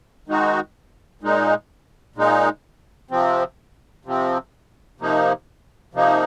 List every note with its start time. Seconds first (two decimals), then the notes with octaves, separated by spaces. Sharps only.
0.27 D#3 G#3 D#4 F#4
1.21 A#2 G#3 D#4
2.16 A#2 G#3 D#4
3.11 C3 F3 C4
4.05 C3 F3 C4
5.00 C3 F3 A#3 D#4
5.94 C3 F3 A#3 D#4